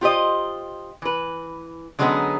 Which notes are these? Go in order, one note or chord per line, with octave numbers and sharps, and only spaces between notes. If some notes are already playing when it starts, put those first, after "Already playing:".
F4 G4 C5 D#5
E3 B4
D3 F#3 G#3 B3 C#4 D#4